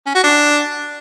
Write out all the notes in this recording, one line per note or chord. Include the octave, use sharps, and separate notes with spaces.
C#4
F#4
D4